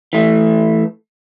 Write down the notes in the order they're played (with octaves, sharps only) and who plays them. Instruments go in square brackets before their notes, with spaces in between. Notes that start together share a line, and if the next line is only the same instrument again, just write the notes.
[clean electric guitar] E3 A3